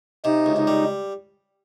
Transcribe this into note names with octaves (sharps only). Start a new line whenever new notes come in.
C3 D#4
C#2
D#4
G3